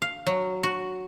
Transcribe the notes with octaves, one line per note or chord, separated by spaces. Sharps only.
F5
F#3
F#4